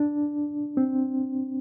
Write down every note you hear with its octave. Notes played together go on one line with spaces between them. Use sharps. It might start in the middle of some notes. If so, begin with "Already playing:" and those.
Already playing: D4
C4